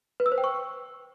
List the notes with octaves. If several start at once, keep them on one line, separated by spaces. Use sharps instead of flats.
B4
E6
C5
G5
C#6